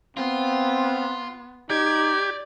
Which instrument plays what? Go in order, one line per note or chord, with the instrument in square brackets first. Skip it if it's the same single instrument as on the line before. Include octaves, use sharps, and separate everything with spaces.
[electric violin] B3 [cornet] C4 [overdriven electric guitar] F4
[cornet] D#4 [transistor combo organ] G4 [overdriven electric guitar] D5 [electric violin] G#6